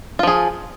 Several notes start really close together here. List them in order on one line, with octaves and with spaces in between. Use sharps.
F4 F3 G#4